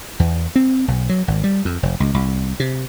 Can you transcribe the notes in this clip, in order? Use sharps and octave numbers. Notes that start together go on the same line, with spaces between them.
E2
C4
B1
F#3
G#1
G3
F2
F1
C#2
C2
C3